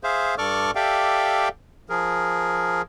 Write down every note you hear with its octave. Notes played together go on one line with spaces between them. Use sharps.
G#4 C5 E5 F5
G2 A4 D5 C#6 D6 F6
G4 A4 D5 E5 F5 G5
F3 G#4 A#4